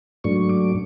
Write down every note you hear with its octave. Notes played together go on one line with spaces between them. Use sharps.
G#2 F#3 A3 D4 C#6
D6